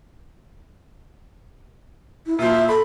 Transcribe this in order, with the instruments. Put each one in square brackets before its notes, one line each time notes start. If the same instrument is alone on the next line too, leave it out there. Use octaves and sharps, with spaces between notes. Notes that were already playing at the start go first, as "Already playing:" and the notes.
[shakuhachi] E4
[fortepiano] A#2 F3 [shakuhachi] E5
[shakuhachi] A4 [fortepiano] B5